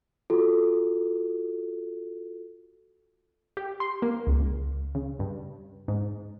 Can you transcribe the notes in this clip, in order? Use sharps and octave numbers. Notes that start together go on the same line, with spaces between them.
F4 F#4 A4
G4
C6
A#3
C#2
C#2
C#3
G2
G#2